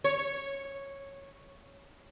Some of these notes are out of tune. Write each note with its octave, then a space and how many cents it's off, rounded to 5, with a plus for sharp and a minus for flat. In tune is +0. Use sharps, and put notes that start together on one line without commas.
C#5 -10